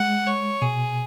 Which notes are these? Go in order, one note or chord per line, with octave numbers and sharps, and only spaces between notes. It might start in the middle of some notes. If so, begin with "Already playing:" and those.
Already playing: G#3 F#5
C#5
B2 G#4